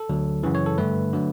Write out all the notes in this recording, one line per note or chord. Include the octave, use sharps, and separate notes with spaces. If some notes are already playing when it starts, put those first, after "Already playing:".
Already playing: A4
D2 D3 F#3
F#2 C#3 E3
C#5
A4
G2 D3 A3 B4
D3 F#3 A3